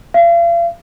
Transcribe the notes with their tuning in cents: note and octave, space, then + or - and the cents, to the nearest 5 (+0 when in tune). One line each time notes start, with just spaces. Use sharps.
F5 -40